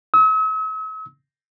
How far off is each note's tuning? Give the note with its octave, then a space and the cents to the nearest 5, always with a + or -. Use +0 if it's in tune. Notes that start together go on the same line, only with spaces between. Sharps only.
E6 -45